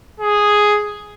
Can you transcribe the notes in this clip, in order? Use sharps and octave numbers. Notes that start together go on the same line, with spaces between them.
G#4